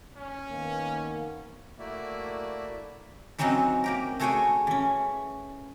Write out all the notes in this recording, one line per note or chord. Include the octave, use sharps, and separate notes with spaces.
C#4
D#3 A#3 B3
A3 A#3 E4 F#4 D5 E5
E3 F#3 C4 C#4 D#4 F#4
A#3 G4 A#4
A3 F#4 G#4 C#5 G5 G#5
E3 C#4